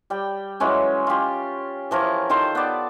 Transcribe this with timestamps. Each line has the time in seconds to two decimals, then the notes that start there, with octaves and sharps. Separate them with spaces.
0.10 G3 G5
0.60 E3 F#3 G#3 C#4
1.07 F4 G4
1.91 E3 F3 A#4 C#5
2.30 D#3 F4 A4 C5
2.55 B3 D5